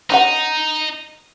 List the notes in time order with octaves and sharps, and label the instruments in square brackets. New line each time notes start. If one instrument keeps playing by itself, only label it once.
[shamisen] C#4 G4 F#5 [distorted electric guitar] D#4